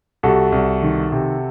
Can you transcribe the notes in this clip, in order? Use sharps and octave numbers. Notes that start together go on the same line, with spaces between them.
C2 F#4 A4
C2
D#3
C3